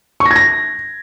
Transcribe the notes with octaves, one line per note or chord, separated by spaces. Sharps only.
C#6
A#6
G#6
A#6